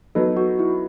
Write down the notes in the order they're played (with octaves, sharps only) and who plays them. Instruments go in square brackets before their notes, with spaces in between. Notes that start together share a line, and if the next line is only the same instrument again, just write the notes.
[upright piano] F#3 B3 D#4 [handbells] A4
[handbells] F#4
E4